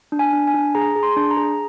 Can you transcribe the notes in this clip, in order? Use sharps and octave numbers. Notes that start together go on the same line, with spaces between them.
D4
G#5
D4
G#5
D4
G#4 A#5
G#4
C6
D4
A#5
G#4